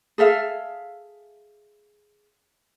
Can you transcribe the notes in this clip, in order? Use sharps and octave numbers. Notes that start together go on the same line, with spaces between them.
G#4 A4 E5 F5